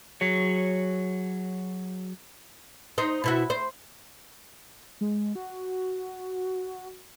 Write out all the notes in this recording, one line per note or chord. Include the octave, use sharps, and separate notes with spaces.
F#3 G#4 C#5
D#4 C5
B2 E4 F#4
C5
G#3
F#4